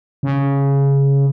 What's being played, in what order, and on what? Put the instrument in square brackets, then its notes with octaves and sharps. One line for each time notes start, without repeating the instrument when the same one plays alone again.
[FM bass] C#3